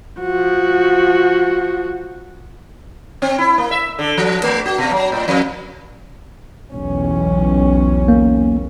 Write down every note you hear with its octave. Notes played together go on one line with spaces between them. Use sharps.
F3 F#4
C4
E4
A#3
E5
D3
F3
A3
F#4
B2
F#3
A2
F2
B1 E2 C#4
A#3